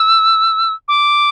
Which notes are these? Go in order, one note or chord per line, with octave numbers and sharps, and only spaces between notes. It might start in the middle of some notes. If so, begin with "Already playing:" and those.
Already playing: E6
D6